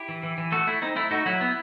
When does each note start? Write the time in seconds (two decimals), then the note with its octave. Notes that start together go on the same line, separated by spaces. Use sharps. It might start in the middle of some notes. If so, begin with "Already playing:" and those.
Already playing: E4 G4
0.09 E3
0.23 E3
0.38 E3
0.52 A3 F#4 A4
0.67 A3 E4
0.82 C4 D#4
0.96 A3 E4
1.11 A3 D#4 F#4
1.26 F#3 E4
1.41 B3